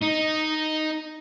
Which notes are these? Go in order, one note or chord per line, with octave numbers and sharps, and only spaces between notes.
D#4